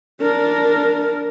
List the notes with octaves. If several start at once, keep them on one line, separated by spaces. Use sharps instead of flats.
D4 A#4